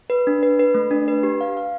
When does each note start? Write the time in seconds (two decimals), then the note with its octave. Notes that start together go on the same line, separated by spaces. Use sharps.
0.10 B4
0.27 D4
0.43 B4
0.59 B4
0.75 A3
0.91 D4
1.08 B4
1.23 G4
1.41 F5
1.57 F5